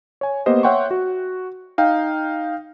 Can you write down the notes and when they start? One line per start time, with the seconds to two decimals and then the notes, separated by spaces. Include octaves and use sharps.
0.21 C#5 G#5
0.46 A#3 B3 G4 C5 D#5
0.63 C#5 E5 F#5 G5 C6 C#6
0.91 F#4
1.78 D#4 F5 G5